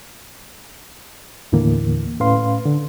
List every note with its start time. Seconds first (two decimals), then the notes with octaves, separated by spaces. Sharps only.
1.52 D#2 A2 D3 E3 A#3
2.20 A2 C#4 B4 F5 C6
2.65 D3